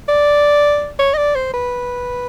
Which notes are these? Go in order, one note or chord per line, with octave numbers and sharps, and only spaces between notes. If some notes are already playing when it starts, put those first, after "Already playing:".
D5
C#5
D#5
D5
C5
B4